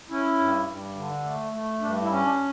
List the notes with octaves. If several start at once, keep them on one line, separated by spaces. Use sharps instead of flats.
C#4 E4
G2
G2
D3
A3
A3
G2 D4
E4
C#4
D4